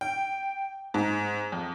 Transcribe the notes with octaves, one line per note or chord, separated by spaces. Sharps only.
G5
G#2
F2